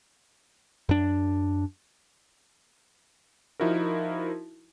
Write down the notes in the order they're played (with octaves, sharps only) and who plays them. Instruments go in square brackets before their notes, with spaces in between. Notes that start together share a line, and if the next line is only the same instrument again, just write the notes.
[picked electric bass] F#2 D4
[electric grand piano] F3 D#4 E4 F#4 A#4